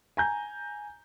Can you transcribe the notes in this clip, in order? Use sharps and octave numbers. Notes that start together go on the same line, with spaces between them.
G#5 A#5 G6